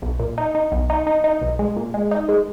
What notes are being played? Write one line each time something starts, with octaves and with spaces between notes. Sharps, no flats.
B1
A#2
D#4
D#4
B1
D#4
D#4
D#4
B1
G#3
A#2
G#3
D#4
G#3